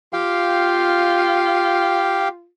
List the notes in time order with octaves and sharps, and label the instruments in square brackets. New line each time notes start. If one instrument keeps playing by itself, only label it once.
[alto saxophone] F4 [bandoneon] G4 F5 G5